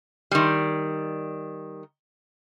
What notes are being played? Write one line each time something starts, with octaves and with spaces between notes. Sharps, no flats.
D#3 G3